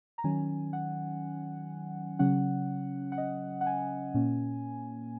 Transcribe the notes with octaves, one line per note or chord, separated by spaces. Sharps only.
A#5
D#3 F#3 C#4 G#5
F#5
C#3 F#3 C#4 F#5
F#5
D#5
F#5
G#5
A#2 A#3 C#4